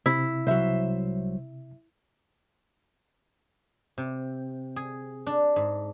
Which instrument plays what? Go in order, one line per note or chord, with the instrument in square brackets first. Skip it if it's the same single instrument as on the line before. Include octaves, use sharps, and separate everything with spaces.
[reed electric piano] C3 [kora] E4
[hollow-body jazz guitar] C2 F#3 [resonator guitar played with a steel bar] C5 E5
[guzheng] C3
G#4
D4
G#2